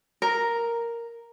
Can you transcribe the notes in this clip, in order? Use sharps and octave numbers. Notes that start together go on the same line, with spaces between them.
A#4